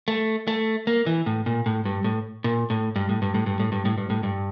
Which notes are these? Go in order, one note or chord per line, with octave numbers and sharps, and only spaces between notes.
A3
A3
A#3
E3
A2
A#2
A2
G2
A2
A#2
A2
G2
A2
G2
A2
G2
A2
G2
A2
G2
A2
G2